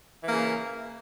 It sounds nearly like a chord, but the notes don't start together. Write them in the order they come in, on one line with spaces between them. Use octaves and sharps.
E3 A#3 C#3